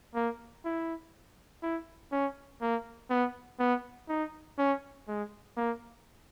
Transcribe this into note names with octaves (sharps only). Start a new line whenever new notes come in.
A#3
E4
E4
C#4
A#3
B3
B3
D#4
C#4
G#3
A#3